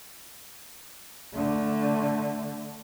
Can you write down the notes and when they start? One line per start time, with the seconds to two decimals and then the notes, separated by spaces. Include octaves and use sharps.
1.34 D3 A3